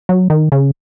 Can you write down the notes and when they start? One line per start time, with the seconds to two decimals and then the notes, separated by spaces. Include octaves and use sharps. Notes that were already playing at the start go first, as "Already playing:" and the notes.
0.09 F#3
0.30 D#3
0.52 C#3